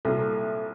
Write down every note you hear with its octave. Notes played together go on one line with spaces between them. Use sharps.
C2 A#2 F#3 A4